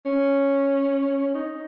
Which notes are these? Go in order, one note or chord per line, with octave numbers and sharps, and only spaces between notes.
C#4
D#4